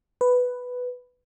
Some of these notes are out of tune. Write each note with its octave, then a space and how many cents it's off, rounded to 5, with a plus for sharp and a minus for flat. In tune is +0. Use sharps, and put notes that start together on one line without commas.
B4 +5